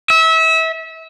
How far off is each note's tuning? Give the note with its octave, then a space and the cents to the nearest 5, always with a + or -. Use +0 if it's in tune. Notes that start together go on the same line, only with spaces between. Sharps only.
E5 -30